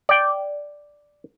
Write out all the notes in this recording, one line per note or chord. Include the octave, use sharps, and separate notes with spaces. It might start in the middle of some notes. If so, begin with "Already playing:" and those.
D5 G5